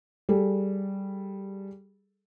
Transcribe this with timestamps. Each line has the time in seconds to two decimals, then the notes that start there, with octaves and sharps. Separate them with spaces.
0.29 G3 G#4 A4